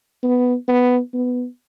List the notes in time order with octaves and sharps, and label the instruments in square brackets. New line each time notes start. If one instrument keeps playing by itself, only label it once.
[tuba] B3
B3
B3